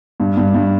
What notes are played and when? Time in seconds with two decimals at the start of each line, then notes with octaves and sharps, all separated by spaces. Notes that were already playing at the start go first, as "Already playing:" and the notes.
0.20 G2
0.37 G2
0.54 G2